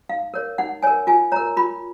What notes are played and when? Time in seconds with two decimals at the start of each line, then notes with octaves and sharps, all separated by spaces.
0.09 D#4 F5
0.34 A#4 C#5
0.58 D#4 F#5
0.82 A#4 C#5 G#5
1.07 F4 G#5
1.32 A#4 C#5 A#5
1.57 F4 B5